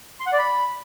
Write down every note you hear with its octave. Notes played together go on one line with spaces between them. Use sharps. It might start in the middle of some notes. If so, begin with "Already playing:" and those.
C6
F#5
D5
B5